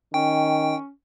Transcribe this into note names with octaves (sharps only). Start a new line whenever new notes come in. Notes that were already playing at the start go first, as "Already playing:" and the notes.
D#3 C#4 G5